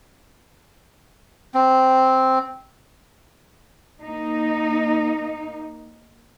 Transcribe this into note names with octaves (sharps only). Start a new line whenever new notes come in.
C4
A#3 D#4